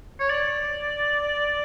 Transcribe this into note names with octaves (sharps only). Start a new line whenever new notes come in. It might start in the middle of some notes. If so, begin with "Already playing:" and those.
C#5
D5